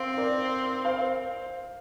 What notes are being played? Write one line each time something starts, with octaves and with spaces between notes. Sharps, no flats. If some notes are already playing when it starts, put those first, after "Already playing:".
Already playing: C4 C5 F5
A#4 D5
C5 F5